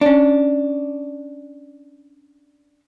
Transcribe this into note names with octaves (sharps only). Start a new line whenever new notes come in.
C#4 D4